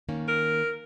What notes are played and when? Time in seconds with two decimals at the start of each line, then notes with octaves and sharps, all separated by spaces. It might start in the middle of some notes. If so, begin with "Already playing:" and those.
0.09 D#3 A#3 C#4
0.28 A#4